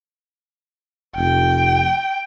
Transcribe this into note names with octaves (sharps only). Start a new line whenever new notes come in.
F1 G5